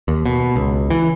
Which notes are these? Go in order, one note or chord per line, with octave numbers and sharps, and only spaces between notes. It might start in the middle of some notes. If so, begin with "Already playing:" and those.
D#2
B2
C#2
E3